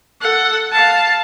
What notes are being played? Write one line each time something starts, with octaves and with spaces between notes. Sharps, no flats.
A4 F#5
F5 A5